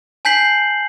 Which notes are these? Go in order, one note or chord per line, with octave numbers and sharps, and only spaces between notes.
G#5 A5 G6 B6 C7 F#7